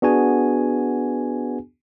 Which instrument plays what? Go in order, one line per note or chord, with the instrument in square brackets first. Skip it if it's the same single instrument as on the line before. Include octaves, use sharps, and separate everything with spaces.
[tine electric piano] B3 D4 F#4 G#4 G#5